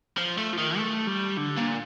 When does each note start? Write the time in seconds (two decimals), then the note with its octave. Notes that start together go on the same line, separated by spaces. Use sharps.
0.18 F3
0.38 A3
0.53 F3
0.58 D#3
0.77 A3
1.07 G3
1.37 D3
1.57 A#2